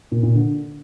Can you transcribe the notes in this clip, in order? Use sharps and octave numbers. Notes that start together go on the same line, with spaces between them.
A#2
A#2
D3